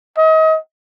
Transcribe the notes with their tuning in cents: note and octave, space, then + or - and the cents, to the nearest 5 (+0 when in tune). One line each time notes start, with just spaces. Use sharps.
D#5 +35